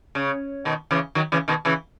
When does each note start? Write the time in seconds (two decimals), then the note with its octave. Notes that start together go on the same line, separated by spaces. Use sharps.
0.15 C#3
0.65 B2 D#3
0.91 C#3 E3
1.15 D#3 F#3
1.32 C#3 E3
1.48 B2 D#3
1.65 C#3 E3